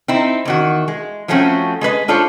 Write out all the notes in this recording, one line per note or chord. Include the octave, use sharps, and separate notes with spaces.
C4 D#4 E4
E2 D#3 F#4
G#3
F3 F#3 A3 C4 C#4 F#4
G#3 G#4 B4 D#5
D4 F4 A4 C5 C#5